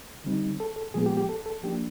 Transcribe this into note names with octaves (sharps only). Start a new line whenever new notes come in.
D3 G3 C4 D#4
A4
A4
A#2 F3 G#3 B3 G#4
G4
G4
A4
A4
F3 A#3 D4 G4